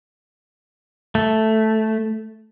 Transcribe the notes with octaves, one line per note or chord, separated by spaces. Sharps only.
A3